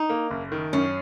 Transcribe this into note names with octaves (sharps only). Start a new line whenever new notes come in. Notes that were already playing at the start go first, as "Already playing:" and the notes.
Already playing: D#4
A#3
F#1
D#3
F#2 C#4